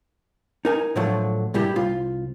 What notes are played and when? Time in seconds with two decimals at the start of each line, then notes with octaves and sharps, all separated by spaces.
0.65 D#4 A#4 G#5
0.96 A2 D3 F3 F#3 A3
1.54 G2 A#2 G3 E4 G4
1.76 C2 F4